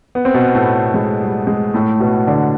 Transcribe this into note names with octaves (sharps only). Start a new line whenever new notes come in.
B3
C4
B2 B3
A2 A3
G#3
G3
G#3
A2 A3
B2 B3
D3 D4